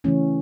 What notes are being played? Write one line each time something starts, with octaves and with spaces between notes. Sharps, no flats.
C#3 E3 A3 C#4